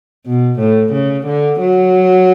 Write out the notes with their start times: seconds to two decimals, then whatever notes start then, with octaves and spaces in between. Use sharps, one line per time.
0.26 B2
0.60 A2
0.93 C#3
1.26 D3
1.60 F#3